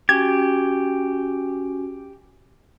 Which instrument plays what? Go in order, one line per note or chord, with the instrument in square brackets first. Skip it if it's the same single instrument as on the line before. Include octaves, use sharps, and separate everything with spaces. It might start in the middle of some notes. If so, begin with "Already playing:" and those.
[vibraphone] C#4 F#4 G#5 [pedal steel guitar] G4 [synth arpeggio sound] G#6